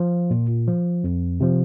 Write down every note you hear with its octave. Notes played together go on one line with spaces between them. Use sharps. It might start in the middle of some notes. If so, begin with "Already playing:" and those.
Already playing: F3 F4
A#2
F3
F2
C3 F3